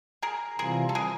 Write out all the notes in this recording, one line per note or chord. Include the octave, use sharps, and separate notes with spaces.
G#4 A#4
C3 E3 G3 C4 F4 G#4 A#4
A4
G#4 A#4